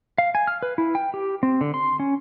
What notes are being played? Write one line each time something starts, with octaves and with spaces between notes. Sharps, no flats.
F5
G#5
F6
B4
E4
G5
G4
C4
D3
C6
C#4